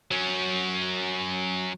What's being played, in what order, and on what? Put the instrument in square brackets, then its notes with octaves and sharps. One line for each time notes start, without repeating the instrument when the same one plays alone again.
[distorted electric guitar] F#3 C#4